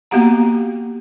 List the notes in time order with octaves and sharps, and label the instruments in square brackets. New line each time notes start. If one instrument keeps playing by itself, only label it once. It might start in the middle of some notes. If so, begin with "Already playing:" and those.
[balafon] A#3 B3 F#4 G4 F#5 A#5